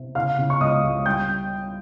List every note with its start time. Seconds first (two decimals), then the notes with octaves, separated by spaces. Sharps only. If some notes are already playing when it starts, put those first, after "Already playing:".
Already playing: C3
0.15 C#3 F5 F6
0.38 C#3
0.50 C#6
0.60 C#2 D#5 D#6
0.83 C#2
1.06 G3 G5 G6